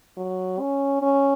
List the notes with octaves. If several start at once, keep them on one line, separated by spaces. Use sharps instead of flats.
F#3
C#4
C#4